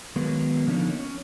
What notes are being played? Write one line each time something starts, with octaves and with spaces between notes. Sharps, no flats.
D#3 F#3 G#3 A#3 B3 B4
D3 F3 A#3 B3 C#4 D#4
C#4